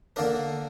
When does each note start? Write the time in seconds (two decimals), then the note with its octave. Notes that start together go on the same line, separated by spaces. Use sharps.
0.16 D3 A#3 D4 A#4